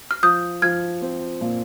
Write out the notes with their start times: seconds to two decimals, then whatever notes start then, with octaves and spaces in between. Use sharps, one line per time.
0.11 F6
0.23 F3 D#6 G6
0.62 F3 F6 G#6
1.02 C4
1.41 A#2